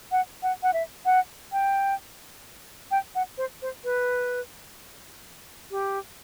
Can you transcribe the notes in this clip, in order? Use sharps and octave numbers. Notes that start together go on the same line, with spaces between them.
F#5
F#5
F#5
E5
F#5
G5
G5
F#5
C5
C5
B4
G4